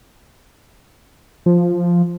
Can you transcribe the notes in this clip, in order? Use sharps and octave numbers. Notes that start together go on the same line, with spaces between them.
F3